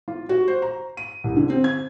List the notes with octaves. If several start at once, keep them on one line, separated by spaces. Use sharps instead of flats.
F4
F#4
C5
A#5
D#7
C2
D3
C4
G#6